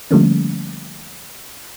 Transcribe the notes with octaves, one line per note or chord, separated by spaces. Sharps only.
D3 F3 G3 A3 A#3 C#4